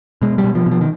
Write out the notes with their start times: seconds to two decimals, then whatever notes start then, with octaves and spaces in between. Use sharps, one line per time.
0.22 B2 G#3
0.38 G3
0.44 B2
0.55 F3
0.66 B2
0.71 F3
0.81 D#3